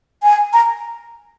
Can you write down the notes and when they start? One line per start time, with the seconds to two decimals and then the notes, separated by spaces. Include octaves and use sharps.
0.23 G#5
0.53 A#5